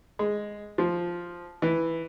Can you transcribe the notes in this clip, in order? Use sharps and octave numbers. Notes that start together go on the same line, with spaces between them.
G#3
F3
E3